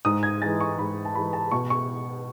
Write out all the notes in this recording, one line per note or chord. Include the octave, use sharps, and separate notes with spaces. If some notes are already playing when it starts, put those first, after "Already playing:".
G#2 D#6
G#6
E3 G#3 A6
C#6
G#2 B5
A5
E3 G#3 B5
A5
B2 C#6
C#6